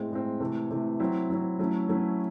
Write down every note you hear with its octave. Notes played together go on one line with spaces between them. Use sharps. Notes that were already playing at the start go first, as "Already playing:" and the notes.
Already playing: A2 G#3 C4
A2 G#3 C4
C3 E3 A3
C3 E3 A3
F#3 C4 E4
F#3 C4 E4
F#3 A3 C#4 E4
F#3 A3 C#4 E4